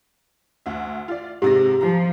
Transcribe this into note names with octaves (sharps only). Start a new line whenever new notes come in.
D2 F#4 E5
F4 D5
G#2 C3 G4 A#6
F3 A#5